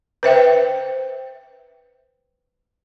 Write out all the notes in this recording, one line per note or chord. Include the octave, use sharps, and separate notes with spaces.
B4 C5 E5 G5